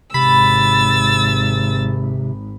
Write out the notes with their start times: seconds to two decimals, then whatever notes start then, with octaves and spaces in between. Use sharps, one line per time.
0.14 G#1 C3 B5 E6 A6